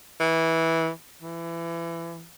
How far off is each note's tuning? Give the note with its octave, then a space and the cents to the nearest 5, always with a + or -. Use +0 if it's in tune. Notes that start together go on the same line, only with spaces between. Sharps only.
E3 -15
E3 +25